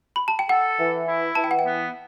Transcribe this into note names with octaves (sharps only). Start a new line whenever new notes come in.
B5
A5
G5
A4 F#5
E3
E4
E3 A5
G5
F#5
G5
B3